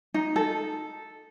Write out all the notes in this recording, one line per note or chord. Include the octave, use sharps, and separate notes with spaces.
D#4
A4